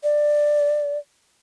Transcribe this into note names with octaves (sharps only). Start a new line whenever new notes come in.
D5